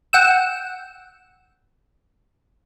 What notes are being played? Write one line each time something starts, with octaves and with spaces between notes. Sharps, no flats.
F#5 G5 E6